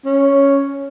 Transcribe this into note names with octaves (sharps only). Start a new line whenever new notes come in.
C#4